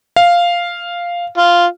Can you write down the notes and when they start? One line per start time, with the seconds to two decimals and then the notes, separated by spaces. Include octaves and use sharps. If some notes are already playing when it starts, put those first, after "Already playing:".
0.16 F5
1.38 F4